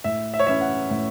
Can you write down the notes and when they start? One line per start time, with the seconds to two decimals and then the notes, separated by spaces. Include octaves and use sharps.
0.04 A2 E5
0.34 E5
0.40 C#5
0.47 E3 C#4 E4 E5
0.61 F#5
0.90 A2